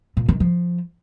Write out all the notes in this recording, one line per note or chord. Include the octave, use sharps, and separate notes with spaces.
A#2
D#3
F3